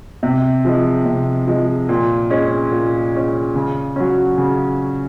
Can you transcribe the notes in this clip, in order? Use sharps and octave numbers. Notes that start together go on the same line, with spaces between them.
C3
F3 G#3
C3
F3 G#3
A#2
G#3 C#4
A#2
G#3 C#4
C#3
F#3 C#4
C#3